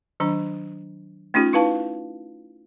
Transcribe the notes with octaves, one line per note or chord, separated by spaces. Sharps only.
D#3 F#3 D4 A#5
A3 C#4 D#4 F4 G4
D#4 E4 B4 F5 A5